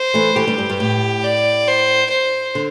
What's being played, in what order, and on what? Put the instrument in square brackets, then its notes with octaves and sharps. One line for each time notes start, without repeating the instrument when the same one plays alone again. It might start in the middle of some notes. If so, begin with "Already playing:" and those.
Already playing: [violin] C5
[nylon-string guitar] E3 A3
[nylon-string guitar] E3 A3 [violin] G4
[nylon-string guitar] D3 G3
G2
G2
[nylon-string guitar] A2 [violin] G4
[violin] D5
C5
C5
[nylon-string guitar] D3